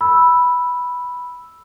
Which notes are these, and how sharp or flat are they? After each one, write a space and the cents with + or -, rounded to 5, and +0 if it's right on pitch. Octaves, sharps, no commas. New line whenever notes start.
B5 -5 E6 +0